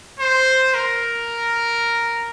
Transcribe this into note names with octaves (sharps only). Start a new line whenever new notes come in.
C5
A#4